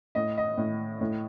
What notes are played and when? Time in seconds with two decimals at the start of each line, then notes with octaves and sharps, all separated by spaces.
0.15 A2 D#5
0.37 D#5
0.58 A2
1.01 A2